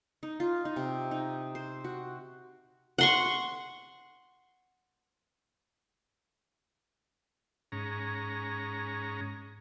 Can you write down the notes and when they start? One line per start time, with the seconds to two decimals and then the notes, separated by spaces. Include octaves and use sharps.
0.23 D#4
0.40 F4
0.65 D#4
0.76 C3
1.11 D#4
1.55 C5
1.84 F#4
2.98 F#5 C6 C#6
7.72 G#2 C#4 A#5